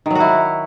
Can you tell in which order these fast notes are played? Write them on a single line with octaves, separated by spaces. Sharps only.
D#3 F#3 F#4 E4